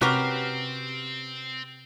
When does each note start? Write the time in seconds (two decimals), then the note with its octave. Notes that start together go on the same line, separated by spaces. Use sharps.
0.01 C3 C4 C#4 F#4 G4 A#4 B4